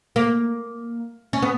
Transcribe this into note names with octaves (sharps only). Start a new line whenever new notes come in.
A#3
C#4
B3